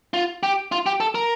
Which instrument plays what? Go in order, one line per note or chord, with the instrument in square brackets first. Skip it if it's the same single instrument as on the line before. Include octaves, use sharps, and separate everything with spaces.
[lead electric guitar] F4
G4
F4
G4
A4
A#4